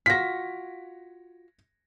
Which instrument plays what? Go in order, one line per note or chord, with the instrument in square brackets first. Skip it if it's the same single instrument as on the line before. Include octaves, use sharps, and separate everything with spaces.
[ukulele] F4 F#4 [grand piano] A#6 B6